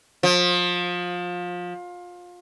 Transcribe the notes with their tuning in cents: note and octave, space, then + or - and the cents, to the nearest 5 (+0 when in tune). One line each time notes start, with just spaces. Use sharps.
F3 +25